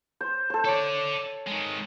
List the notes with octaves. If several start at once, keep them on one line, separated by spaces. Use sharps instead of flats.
C5
A4 C5
A4 C#5 D5
D#3 G#3